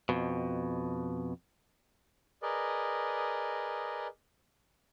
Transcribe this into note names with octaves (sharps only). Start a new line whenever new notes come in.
F2 B2
G#4 A#4 B4 D5 D#5